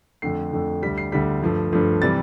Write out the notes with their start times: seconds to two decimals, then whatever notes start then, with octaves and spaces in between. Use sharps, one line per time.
0.22 F2 D3 A3 C7
0.53 F2 D3 A3
0.82 D2 D3 G3 B6
0.98 C7
1.12 D2 D3 G3 B6
1.42 G2 F3 A3
1.72 G2 F3 A3
2.02 C3 E3 G3 A6